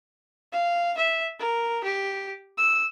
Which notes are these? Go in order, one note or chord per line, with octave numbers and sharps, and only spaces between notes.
F5
E5
A#4
G4
E6